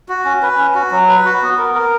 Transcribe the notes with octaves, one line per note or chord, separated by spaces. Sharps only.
F#4
C#4
B4
C#4
F#4
F#3
B4
F#4
B3
A#4
A#4